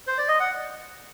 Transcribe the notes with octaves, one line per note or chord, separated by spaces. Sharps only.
C5
D5
D#5
F#5